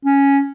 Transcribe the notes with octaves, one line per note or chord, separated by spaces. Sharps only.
C#4